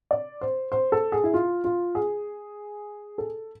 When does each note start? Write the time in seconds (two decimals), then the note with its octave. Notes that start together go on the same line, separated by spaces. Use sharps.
0.11 D5
0.41 C5
0.72 C5
0.92 A4
1.12 G#4
1.24 E4
1.34 F4
1.64 F4
1.95 G#4
3.18 A4